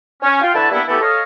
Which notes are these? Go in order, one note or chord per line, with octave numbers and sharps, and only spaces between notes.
C#4
F4 G5
D3 E3 E4 F#4 B4 A5
G3 A#3 B3 D4 E4
E3 A3 B3 E4 G4 A4
A4 C#5 D#5 F5